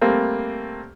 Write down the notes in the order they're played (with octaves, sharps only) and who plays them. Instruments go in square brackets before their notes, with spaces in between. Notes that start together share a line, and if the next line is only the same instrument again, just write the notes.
[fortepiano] G3 A3 A#3 C4